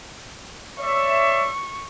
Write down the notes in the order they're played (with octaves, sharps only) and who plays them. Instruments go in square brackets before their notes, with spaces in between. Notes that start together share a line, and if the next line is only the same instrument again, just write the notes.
[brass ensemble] C#5 D5 E5 [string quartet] C#6